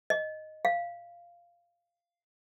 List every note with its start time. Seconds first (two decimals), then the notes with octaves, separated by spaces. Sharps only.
0.10 D#5
0.65 F5